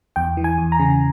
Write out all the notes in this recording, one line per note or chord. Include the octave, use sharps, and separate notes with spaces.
E2 G5
E3
G#5
E2
A#5
C#3